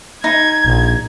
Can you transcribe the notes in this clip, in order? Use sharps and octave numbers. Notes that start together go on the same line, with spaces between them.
D#4 G#6
A#1